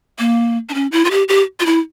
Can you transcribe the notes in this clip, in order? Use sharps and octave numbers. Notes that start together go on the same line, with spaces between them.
A#3
D4
C#4
E4
F4
G4
G4
F4
E4